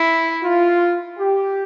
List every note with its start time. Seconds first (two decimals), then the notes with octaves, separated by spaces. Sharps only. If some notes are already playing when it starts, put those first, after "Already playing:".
Already playing: E4
0.43 F4
1.19 G4